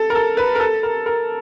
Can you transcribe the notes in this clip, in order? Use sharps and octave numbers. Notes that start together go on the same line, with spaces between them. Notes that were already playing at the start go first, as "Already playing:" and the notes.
Already playing: A4
A#4
A4
B4
A#4
A4
A#4
A#4